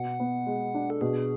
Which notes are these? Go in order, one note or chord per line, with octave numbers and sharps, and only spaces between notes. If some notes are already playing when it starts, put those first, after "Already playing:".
Already playing: B2 F#5
B3
G#3
D4
A4
B2 G#4